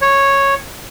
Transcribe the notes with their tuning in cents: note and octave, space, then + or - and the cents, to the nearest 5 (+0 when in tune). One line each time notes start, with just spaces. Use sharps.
C#5 -5